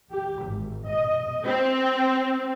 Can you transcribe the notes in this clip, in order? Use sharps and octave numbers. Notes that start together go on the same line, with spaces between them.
G4
G#1
D#5
C4